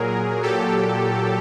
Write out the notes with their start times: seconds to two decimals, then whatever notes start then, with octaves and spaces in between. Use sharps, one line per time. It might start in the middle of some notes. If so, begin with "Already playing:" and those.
Already playing: A#2 F#3 G#4 A#4
0.43 A#2 F#3 G4 A4